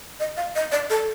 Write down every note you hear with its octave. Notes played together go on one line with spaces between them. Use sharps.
D#5
F5
D#5
D5
A4